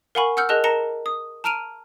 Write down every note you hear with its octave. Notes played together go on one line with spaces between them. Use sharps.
A#4 F5 F#5 G#5 B5 C#6
F#5 E6 F6 G6 C#7
G#4 A#4 D#5 A5 F#6
A#4 A5 A#5 A#6 C#7 E7
D#6
A5 A#5 F6 D7 D#7 F7